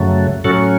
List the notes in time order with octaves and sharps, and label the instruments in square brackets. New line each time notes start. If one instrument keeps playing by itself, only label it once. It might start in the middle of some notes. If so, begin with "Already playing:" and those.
Already playing: [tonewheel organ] F#2 C#3 F#3 A3
A2 F#3 C#4 F#4 A4